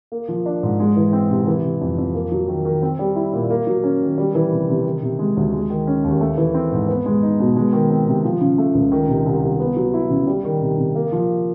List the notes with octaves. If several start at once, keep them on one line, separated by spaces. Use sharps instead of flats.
A#3
F3
D4
G#2
G#3
E3
C4
C3
E3
C3
F2
F2
A#3
F#3
D#3
D#3
C4
G3
E4
A#2
A#3
F#3
C#4
D#3
G3
E3
C3
C3
D#3
C3
G#3
D2
G#3
D#3
C#4
D#2
A3
E3
C4
G#2
B3
G#3
D#4
B2
G#3
D#3
C4
C3
F3
C#3
A3
C#2
D#3
C3
C2
C2
B3
F#3
E4
C#3
G3
D#3
C3
C3
A#3
F3